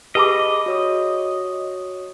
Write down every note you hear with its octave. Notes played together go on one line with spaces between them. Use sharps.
G4 G#4 B4 D#5 A5 B5 D6
F#4 C#5 D#6